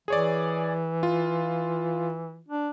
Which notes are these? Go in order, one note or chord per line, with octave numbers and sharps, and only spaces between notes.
E3 G#4 C#5 D5
F4
D4